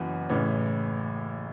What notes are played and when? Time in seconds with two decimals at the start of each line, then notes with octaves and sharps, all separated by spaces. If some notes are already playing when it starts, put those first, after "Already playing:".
Already playing: F#1 F#2 E3 B3
0.29 A1 A2 C#3 E3 C#4